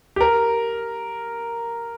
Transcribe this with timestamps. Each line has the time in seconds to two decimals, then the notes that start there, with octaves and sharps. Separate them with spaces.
0.16 G4
0.21 A#4